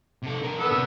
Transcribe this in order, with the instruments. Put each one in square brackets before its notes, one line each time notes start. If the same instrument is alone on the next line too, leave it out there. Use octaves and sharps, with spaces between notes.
[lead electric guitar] C3 A4
D3 A#4
[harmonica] B3 E6 [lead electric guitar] A4
[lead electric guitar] C3